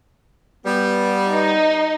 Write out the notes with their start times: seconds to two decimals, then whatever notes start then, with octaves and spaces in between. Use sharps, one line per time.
0.66 G3 B3
1.30 D#4